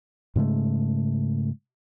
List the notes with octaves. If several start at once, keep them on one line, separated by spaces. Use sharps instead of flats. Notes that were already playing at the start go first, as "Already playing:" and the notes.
G#2 C#3 G#3 A3